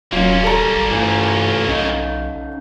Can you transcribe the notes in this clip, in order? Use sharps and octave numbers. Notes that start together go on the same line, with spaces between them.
D#1 F#2 F#3 A#3 C#4 F4
G3 A4 A#5
G#1
G2 E3 A3 F4
B1 C#3 D#4